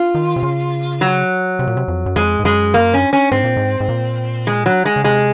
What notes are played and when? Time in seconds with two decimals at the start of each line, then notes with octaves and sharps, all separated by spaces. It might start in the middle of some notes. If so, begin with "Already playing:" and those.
Already playing: F4
0.15 D#3
0.36 C3
0.43 C#3
1.01 F#3
1.59 C3
1.67 A#2
1.77 C3
1.88 F2
2.06 F#2
2.16 F2 G#3
2.39 G#2
2.45 F#2 G#3
2.74 A#3
2.94 C#4
3.13 C#4
3.32 G#2 C4
3.44 A#2
3.57 G#2
3.80 G#2
3.89 A#2
4.47 G#3
4.66 F#3
4.85 G#3
4.96 C#3
5.04 C3 G#3